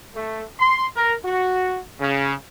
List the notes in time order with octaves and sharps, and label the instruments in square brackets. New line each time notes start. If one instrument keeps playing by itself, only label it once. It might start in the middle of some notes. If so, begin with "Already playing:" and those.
[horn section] A3
C6
A#4
F#4
C#3